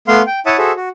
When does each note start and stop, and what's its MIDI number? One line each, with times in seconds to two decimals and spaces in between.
0.08 0.22 57
0.08 0.22 59
0.08 0.22 77
0.08 0.22 84
0.27 0.40 79
0.46 0.57 64
0.46 0.57 73
0.46 0.57 76
0.46 0.57 78
0.46 0.57 81
0.46 0.57 87
0.58 0.72 66
0.58 0.72 68
0.58 0.72 69
0.58 0.72 72
0.58 0.72 76
0.76 0.89 66